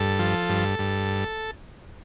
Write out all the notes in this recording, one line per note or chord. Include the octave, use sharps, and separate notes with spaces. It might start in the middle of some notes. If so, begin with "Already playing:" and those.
Already playing: G2 A4
F3
G2
G2